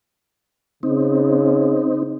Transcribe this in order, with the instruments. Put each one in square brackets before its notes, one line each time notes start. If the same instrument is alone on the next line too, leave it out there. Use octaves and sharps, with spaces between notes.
[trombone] C#3 [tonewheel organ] C4 D#4